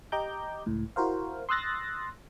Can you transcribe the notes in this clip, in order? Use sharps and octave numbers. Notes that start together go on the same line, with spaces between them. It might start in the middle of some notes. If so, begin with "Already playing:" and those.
G4 D#5 A#5 D6 G6
C#2 A2
E4 F#4 A#4 C5 F5
C6 D#6 E6 F#6 A6 A#6